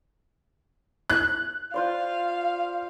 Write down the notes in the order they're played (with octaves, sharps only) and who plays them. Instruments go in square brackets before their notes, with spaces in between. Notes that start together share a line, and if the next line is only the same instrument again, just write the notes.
[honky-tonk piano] F#6
[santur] F4 C5 D5 [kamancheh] F5